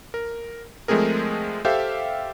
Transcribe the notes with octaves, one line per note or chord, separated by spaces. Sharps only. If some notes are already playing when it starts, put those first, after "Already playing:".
A#4
F3 G#3 A3 C4 G#4 A#4
G4 A4 C5 E5 F5 G5